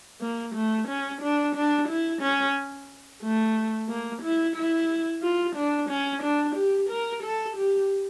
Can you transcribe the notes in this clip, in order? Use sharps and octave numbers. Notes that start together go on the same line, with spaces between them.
A#3
A3
C#4
D4
D4
E4
C#4
A3
A#3
E4
E4
F4
D4
C#4
D4
G4
A#4
A4
G4